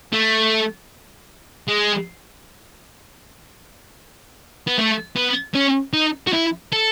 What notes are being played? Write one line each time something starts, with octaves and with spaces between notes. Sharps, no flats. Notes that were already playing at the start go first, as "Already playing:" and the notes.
A3
G#3
B3
A3
B3
C#4
D#4
F#4
E4
A4